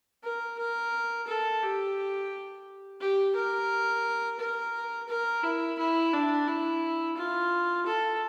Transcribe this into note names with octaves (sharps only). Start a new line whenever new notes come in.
A#4
A#4
A4
G4
G4
A#4
A#4
A#4
E4
E4
D4
E4
F4
A4